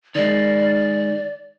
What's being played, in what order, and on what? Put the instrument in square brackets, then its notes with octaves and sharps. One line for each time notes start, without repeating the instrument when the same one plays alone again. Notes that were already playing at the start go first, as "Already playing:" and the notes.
[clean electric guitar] D#3 G#3 [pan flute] D5